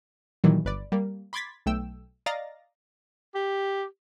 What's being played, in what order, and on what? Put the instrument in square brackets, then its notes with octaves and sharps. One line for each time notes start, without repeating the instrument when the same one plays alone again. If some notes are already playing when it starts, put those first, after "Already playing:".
[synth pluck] A#2 D#3 E3 F#3 G3
G1 B4 D5
G3 A#3
B5 C6 D6 G#6 A6 B6
B1 A3 G5 E6
D5 D#5 F5 A#5 A6 A#6
[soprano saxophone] G4